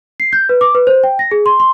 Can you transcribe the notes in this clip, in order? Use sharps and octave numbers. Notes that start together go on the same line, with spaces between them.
C7
G6
B4
D6
B4
C5
G5
A#6
G#4
C6
C6